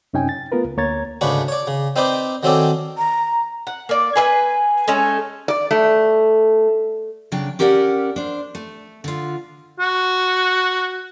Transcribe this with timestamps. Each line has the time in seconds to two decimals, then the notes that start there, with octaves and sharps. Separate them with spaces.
0.13 F#2 C3 C#4 D#4 G5 G#5
0.29 A6
0.52 A3 B3 F4 A#4 B4
0.65 C#2
0.77 D2 A#3 C#5 A#5 G#6 A6
1.21 D2 G#2 C#3 D4 B4 C#6
1.48 C#5 D5
1.67 C#3
1.96 C4 D#4 B4 C5 D5
2.43 D#3 F#3 C4 C#4 A4 D5
2.98 A#5
3.67 F#5
3.89 A#3 D5
4.16 G#4 B4 E5 G#5
4.88 G#3 A3 C#4
5.48 D5
5.71 A3
7.32 C#3 F#3 D4 G5
7.59 C#4 G4 A#4 D5 F5 F#5
8.16 D4 C5
8.55 A3
9.04 D3 F4
9.80 F#4